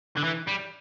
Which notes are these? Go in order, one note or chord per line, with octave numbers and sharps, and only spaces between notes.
D3
E3
G3